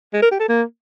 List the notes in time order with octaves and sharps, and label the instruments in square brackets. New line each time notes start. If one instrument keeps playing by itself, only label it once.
[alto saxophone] G#3
A#4
G4
A4
A#3